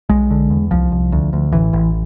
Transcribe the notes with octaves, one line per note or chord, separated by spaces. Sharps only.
B1 G#3
D3
E2
C2 F3
C2
D2
D2
A1 E3
A1